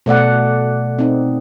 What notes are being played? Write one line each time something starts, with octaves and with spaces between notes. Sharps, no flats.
B2 A3 D5 F#5
C4 D#4